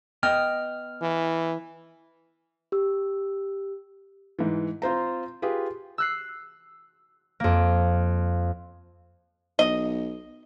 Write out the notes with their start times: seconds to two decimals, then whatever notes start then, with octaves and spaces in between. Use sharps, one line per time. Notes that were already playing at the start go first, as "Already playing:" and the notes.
0.23 B3 D#5 G5 F6
1.01 E3
2.72 G4 E6
4.39 G#2 E3
4.82 C4 F4 C5 A#5
5.42 F4 G4 G#4 B4
5.98 E6 F#6 C7
7.40 F2 A#3
9.59 B1 D#5